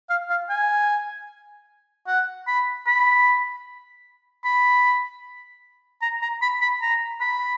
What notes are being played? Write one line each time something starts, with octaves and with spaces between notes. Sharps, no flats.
F5
F5
G#5
F#5
B5
B5
B5
A#5
A#5
B5
B5
A#5
B5